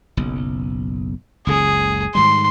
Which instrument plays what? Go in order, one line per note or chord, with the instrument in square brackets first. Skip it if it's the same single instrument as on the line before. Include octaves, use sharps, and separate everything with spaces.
[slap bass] F#1 B1
[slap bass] F#1 C#2 C#3 [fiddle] G#4
[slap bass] G#2 D#3 G3 [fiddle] C6